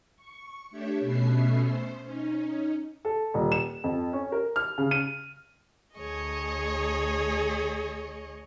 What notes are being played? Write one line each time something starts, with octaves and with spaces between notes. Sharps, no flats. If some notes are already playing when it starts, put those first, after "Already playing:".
C#6
A3 D4 G4 C#5 E5
B2 A3 B3 C#4 E5 C7
C5
C#4 D#4
A4
D#1
E7
F2
C#4
A#4
F6
C#3
D#7
D2 G#4 C#5 D#5